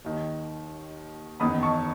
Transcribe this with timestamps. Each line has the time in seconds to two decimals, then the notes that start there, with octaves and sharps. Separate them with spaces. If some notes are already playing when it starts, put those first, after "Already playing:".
0.04 D#2 D#3
1.40 F#1 E2 D#3 B5 D#6
1.63 A5 C#6